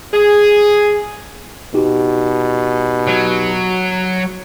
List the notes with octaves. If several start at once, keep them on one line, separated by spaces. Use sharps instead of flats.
G#4
B2 D#4 F#4 G4
F#3